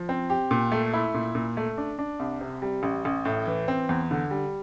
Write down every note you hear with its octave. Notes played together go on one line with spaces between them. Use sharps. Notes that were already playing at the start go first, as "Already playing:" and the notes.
Already playing: F3
C4
G4
A#2
A3
E4
A#2
A#2
A3
D4
D4
C2
C3
G3
A1
A1
A2
E3
C4
E2
D3
G3